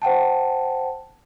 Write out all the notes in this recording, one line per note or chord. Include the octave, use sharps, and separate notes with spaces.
C5 F#5 G5 A5